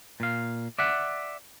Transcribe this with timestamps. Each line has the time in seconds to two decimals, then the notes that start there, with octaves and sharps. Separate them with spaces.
0.20 A#2 F5
0.79 D5 E5 F#5